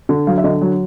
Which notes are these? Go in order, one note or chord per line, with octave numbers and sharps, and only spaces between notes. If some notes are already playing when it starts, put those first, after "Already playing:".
D3
F#3 F5
E5
D3 D#5
F#3